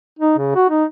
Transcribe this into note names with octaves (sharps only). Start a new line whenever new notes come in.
D#4
C#3
F#4
D#4